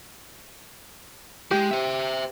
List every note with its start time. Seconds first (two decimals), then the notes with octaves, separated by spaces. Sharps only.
1.51 G#3 G4
1.71 C5 E5